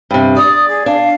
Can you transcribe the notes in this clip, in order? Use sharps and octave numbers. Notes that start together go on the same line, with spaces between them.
G2 C3
D5 D#6
G#4
D4 F5